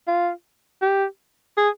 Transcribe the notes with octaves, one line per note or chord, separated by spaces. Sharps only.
F4
G4
G#4